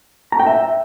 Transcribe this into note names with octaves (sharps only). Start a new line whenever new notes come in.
A#5
G5
E5